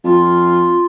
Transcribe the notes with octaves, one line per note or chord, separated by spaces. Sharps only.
F2 F4